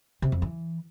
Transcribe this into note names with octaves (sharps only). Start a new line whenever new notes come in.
C3
F2
E3